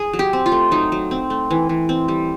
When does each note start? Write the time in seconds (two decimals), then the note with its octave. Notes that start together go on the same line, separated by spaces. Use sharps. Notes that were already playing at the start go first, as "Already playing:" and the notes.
Already playing: G#4
0.13 F#3
0.19 G4
0.33 C4
0.46 F4
0.52 A3
0.71 F#3 D#4
0.92 F#3
1.11 C4
1.30 A3
1.51 E3
1.69 E3
1.89 C4
2.08 G3